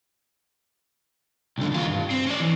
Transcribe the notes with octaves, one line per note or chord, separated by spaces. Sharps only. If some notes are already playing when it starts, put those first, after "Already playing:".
C2 D3
D#2 F4
E2 G2
C4
C#4 D5
E3